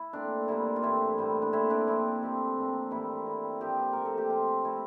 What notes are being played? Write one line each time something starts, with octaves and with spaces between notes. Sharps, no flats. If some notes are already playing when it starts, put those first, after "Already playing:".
Already playing: E4
A#2 A3 C4 D4
A#2 G3 A#3 E4
F4
G2 E3 A3 C4 E4
A2 G3 A#3
D4
A#2 A3 C4 E4
D4
A#2 F3 C4 E4
C3 F3 A3 C4
A#2 F3 C4
A2 E3 G3 A#3 E4
A2 G3 C4
A#2 F3 A#3 G4
C5
A#2 A3 C4 A#4
A4
G4
C3 F3 C4 F4
A#2 A3 C4 E4